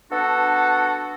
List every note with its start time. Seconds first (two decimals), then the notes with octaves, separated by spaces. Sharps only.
0.12 B3 D4 F#4 A4